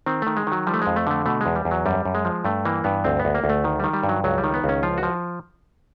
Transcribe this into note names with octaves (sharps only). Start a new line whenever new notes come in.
D#3 C4
D#3 A3
G#3
D#3 F#3
F3 G3
A3
F2 G#3
A3
D3 A3
B2 A3
E2 G#3
G3
E2
F#3
F#2 G3
F#2
G#3
F3
G2 A3
E3 A#3
G2 B3
D2 C4
B3
D2
A#3
D2
A3
D#3
D#3 G3
G3
G2
F#3
C#2 F#3
G3
D#3
B3
C#2 C#4
F3 F4
F#4
F3